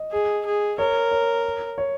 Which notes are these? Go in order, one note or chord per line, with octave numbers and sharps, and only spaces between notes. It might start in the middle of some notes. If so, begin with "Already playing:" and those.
Already playing: D#5
G#4
G#4
A#4 C#5
C#5
C#5